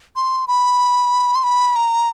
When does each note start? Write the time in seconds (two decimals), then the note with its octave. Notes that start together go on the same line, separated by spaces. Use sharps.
0.16 C6
0.48 B5
1.35 C6
1.44 B5
1.76 A#5